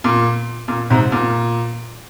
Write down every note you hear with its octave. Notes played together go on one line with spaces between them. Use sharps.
A#2
A#2
G#2 C3
A#2